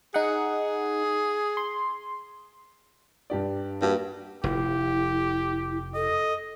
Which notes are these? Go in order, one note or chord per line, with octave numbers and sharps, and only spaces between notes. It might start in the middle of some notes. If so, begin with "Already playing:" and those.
D#4 G#4 F#5
C6
G2 G4 D5
G2 A#3 F#4 G4
F1 E4 G4
A4 D#5